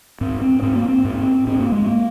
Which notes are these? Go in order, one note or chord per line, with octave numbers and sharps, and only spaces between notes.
G#2 C4
C4
G#2 C4
A#3
C4
G#2
G#2 C4
A#3
G#3
A#3